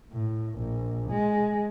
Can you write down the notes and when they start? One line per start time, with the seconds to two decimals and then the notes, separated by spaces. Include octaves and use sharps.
0.12 A2
0.59 A#1
1.11 G#3